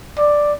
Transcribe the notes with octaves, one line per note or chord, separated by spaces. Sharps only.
D5